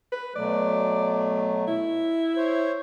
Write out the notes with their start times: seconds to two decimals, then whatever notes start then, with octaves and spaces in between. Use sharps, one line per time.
0.12 B4
0.35 B2 F#3 A3 D5
1.68 E4
2.36 C5 C#5